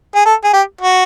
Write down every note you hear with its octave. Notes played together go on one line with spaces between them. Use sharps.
G#4
A4
G#4
G4
F#4